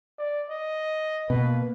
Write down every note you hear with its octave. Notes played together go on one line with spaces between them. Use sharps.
D5
D#5
B2 A#3 B4